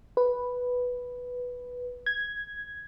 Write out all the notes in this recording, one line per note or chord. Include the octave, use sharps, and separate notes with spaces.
B4
G#6